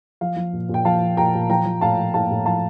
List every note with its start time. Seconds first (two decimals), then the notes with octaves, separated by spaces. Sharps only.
0.21 F3 F5
0.36 F3
0.53 A#2
0.69 A#2
0.74 G5
0.85 F3 F5 A5
1.01 F3
1.17 A#2 G5 A#5
1.34 A#2
1.50 F3 G5 A#5
1.65 F3
1.81 A2 F5 A5
1.97 F3
2.14 A2 F5 A5
2.30 A2
2.46 F3 F5 A5